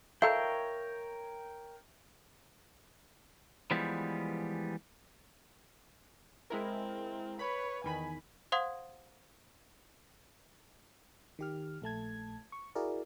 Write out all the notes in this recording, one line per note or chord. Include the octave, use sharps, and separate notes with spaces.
F3 A4 A#4 C#5 E5 F5 G5 A#5
E3 F3 G3 G#3 B3
G#3 C4 E4 A#4
B4 C#5 B5
E2 D#3 G#5 B5
C5 F5 F#5 C6 D#6 G#6
D#3 G4 F6
A#1 A3 A5 G#6
C#6
E4 F#4 G#4 A#4 D5